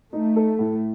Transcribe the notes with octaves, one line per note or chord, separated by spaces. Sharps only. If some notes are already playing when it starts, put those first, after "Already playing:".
A3 D#4
A4
A2